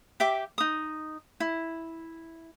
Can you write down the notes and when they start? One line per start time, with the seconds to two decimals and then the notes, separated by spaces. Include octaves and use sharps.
0.20 G4 E5 G5 D6
0.58 D#4 D#6
1.40 E4